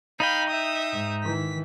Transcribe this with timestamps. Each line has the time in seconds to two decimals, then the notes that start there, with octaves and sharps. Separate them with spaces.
0.20 D#4 D#5 F5 G5 B5
0.50 E5 D#6
0.92 G#2
1.24 D#3 E3 B6